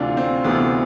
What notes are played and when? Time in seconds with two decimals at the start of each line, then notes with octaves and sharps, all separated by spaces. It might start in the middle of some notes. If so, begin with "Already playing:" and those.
Already playing: D2 C3 E3 D4 F4
0.17 C4
0.44 D2 C3 E3 B3